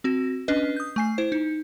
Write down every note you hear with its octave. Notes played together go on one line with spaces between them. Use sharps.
C4 F#4
C#4 D4 B4 D#5
D#6 G6
A3 G#5 C7
E4 C5
D#4